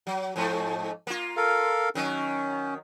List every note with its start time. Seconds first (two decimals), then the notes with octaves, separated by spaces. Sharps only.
0.07 F#3
0.36 F2 G#2 A3
1.07 A#3 F4
1.37 A4 A#4 F5
1.95 D#3 F#3 C#4